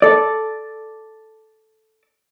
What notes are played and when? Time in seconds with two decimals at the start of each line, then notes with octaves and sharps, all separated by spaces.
0.02 A4 D5